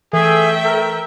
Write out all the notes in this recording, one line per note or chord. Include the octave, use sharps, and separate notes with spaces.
E3 A3 G#4 A4 E5 G5
A#4